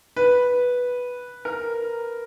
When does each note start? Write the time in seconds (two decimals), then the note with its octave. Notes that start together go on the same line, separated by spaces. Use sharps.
0.17 B4
1.45 A#4